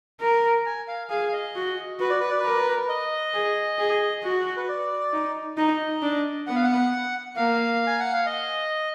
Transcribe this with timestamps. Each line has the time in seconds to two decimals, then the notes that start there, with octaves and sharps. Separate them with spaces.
0.21 A#4
0.66 G#5
0.88 F5
1.10 G#4 F5
1.28 F5
1.33 D#5
1.55 F#4
1.99 F#4 B4
2.10 D5
2.20 B4
2.30 D5
2.39 B4
2.45 A#4
2.89 D#5
3.34 G#4
3.79 G#4
4.24 F#4
4.57 B4
4.68 D5
5.13 D#4
5.57 D#4 D#5
6.02 D4
6.47 B3 F#5
6.56 F5
6.64 F#5
7.36 A#3 F5
7.87 G#5
8.00 F#5
8.13 F5
8.26 D#5